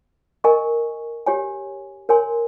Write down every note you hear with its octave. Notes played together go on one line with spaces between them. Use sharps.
A#4 D#5 G#5 C#6
G4 C#5 G#5
A#4 C#5 G#5 C6